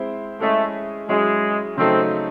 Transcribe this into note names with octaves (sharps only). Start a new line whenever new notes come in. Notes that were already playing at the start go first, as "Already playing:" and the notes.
Already playing: G#3 C4 E4 C5
G#3 A3 C#4 E4 G#4 D#5
F#3 G#3 C#4 E4 G#4
C#3 F#3 A3 C4 D#4 A4